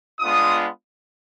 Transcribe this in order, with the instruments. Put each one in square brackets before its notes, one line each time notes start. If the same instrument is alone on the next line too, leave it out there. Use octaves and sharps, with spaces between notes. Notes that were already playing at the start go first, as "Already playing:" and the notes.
[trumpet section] G#3 B3 D4 F4 D#6